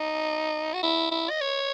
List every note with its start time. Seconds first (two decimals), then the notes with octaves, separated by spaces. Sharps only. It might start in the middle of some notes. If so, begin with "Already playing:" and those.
Already playing: D#4
0.74 F#4
0.83 E4
1.11 E4
1.30 D#5
1.41 C#5